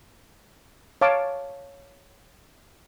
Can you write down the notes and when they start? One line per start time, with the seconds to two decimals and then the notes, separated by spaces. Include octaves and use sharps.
1.01 C#5 F5 A5 D6